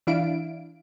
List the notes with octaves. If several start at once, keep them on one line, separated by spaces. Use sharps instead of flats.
E3 D4 E4 F5 D7